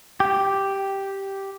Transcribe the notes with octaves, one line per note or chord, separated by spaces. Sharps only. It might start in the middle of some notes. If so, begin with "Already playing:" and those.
G4